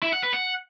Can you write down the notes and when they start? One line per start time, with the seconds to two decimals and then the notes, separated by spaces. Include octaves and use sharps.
0.03 E4
0.13 F#5
0.23 B4
0.34 F#5